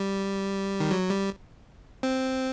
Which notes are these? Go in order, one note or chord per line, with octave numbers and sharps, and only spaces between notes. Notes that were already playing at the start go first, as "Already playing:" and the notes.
Already playing: G3
D#3
F#3
G3
C4